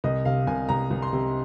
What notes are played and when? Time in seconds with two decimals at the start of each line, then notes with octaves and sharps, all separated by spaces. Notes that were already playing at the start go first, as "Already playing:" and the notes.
0.04 C2 D#5
0.25 C3 F5
0.47 C2 G#5
0.69 C2 A#5
0.91 C2
1.02 C6
1.13 C3